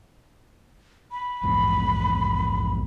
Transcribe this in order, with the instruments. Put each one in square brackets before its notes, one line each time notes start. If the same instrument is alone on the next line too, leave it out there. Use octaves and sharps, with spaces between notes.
[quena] B5
[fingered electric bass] A#1 E2 G#2